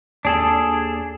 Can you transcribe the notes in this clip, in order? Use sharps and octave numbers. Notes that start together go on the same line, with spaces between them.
D#2 D4 G#4 A4